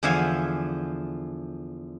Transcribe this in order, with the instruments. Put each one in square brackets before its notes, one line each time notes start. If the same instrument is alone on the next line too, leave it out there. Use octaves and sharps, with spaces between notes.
[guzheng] E2 D3 F3 E5 F5 G#5